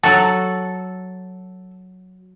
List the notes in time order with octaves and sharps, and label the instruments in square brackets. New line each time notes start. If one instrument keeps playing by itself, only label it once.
[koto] F#3 F#4 [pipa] A4